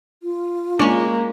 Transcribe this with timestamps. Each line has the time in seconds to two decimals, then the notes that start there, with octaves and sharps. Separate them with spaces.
0.23 F4
0.79 G#3 A#3 C#4 D4 C#5 D5